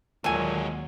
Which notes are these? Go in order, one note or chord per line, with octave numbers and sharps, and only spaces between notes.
D#2 A#2 F#3 G#3 F#4 A4 G#5